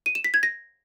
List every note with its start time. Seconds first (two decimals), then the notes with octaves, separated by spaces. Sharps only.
0.06 D#7
0.15 E7
0.24 B6
0.34 G#6
0.43 A#6